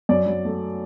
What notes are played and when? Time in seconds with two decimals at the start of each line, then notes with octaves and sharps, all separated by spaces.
0.09 F#2 D5
0.26 F#3
0.45 A3